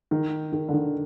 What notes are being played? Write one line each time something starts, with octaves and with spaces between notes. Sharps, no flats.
D#3
D#3
D3
D#3